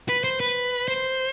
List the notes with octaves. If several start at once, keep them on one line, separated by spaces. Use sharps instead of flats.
B4
C5
B4
C5